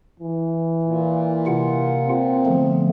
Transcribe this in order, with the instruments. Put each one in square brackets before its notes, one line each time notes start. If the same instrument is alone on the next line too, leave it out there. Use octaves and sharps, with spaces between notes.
[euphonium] E3
[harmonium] A#2
[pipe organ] C3 F4 F#5
[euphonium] C4
[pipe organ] D3 A3 B3 [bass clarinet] F3